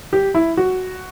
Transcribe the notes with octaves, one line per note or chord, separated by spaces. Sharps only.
G4
E4
F#4